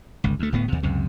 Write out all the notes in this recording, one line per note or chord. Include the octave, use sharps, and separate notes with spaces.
G1 C#2
D2 A3
D1 A2 B3
D#2 C3
C#2 F#2 C3